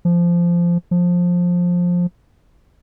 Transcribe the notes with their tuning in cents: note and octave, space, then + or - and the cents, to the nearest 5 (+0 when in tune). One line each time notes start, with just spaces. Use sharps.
F3 -15
F3 +15